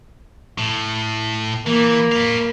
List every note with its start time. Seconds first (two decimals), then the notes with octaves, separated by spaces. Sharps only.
0.58 A2
1.67 E3 A#3
2.12 B4 F5